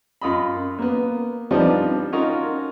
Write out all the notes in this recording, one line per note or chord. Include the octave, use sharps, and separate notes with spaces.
F#2 F4 D#5 B5
A#3 B3
F3 G3 B3 C4 D4 D#4
C#4 D#4 F4 F#4 A#4 D#5